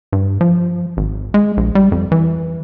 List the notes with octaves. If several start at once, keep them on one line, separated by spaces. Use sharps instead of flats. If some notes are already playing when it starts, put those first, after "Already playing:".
G2
F3
G#1
G#3
A#1
G3
F2
E3